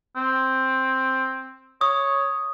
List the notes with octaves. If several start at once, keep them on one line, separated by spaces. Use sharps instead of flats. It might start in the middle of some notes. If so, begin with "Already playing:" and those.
C4
C#5 D#6